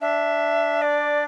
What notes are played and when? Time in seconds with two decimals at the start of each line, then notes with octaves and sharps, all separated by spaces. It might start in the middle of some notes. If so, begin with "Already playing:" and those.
0.01 D4 E5
0.81 D5